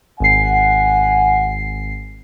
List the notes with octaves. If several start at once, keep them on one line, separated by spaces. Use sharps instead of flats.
G#1 F#5 G#5 C7